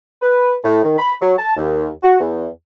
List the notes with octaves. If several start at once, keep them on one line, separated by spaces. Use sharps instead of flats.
B4
A2
D#3
B5
F#3
A5
D#2
F#4
E2